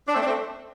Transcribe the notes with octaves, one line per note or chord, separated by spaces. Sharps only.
D4
A3 C4
D4
A3 C4